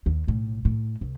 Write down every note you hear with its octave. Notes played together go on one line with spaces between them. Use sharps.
D#2
B1 A2
A2
C2